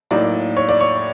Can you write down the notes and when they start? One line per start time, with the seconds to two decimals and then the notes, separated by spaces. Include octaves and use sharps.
0.11 A2 F#3 A#3 D#4 D5
0.57 C#5
0.69 D5
0.81 C#5